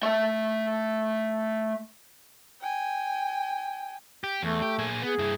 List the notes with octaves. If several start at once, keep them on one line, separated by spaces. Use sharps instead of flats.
A3 E5
G5 G#5
G4
E2 A3
G4
A#2 G#4
B3 G#4
G2 E4